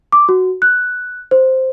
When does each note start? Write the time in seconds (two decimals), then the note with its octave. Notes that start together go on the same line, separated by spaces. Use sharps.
0.12 D6
0.29 F#4
0.62 F#6
1.31 C5